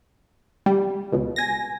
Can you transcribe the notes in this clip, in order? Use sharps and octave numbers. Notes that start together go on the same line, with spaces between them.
G3
C#2 B2
G#5 A#6